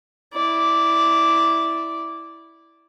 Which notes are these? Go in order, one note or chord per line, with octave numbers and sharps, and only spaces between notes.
E4 D5